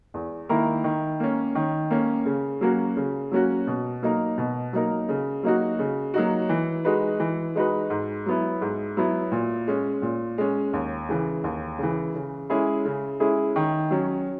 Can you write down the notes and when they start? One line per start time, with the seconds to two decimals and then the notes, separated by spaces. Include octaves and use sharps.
0.14 E2
0.49 D#3 A#3 E4 A#4
0.84 D#3
1.20 A#3 C#4
1.55 D#3
1.91 A#3 C#4
2.26 C#3
2.61 F#3 A#3 C#4 F#4
2.97 C#3
3.31 F#3 A#3 C#4 F#4
3.67 B2
4.02 F#3 A#3 D#4 A#4
4.38 B2
4.73 F#3 A#3 D#4 A#4
5.09 C#3
5.43 F#3 A#3 D#4 F#4
5.79 C#3
6.14 F#3 A#3 D#4 F#4
6.49 E3
6.85 G#3 D#4 F#4 B4
7.20 E3
7.55 G#3 D#4 F#4 B4
7.90 G#2
8.26 F#3 B3 E4
8.61 G#2
8.97 F#3 B3 E4
9.32 A#2
9.67 G#3 C#4
10.02 A#2
10.38 G#3 C#4
10.73 D#2
11.09 C#3 E3
11.44 D#2
11.79 C#3 E3
12.15 C#3
12.50 G#3 C#4 E4 G#4
12.85 C#3
13.20 G#3 C#4 E4 G#4
13.56 D#3
13.91 F#3 C#4